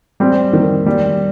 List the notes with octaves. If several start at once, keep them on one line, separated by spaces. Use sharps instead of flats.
G3 C4
D#3
G3